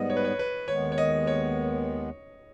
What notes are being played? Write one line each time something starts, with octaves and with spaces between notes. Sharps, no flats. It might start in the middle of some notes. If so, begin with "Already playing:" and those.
Already playing: G#2 G3 B3 D#5
C#5
B4
C#5
B4
D#2 D#3 G#3 B3 C#5
C#5
D#5
C#5